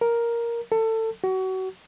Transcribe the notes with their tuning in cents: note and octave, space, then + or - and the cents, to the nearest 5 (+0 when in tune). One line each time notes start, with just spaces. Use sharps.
A#4 +5
A4 +25
F#4 +30